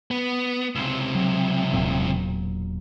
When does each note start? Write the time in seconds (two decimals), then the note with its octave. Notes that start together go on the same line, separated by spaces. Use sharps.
0.11 B3
0.75 C#2 C3
1.15 F#3
1.72 E1 A#2 F#3